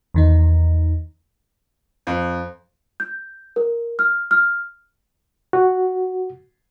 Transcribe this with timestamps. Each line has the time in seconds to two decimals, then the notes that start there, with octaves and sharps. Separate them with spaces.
0.14 E2 D#3 D#4
2.07 F2
3.00 G6
3.56 A#4
3.99 F6
4.31 F6
5.53 F#4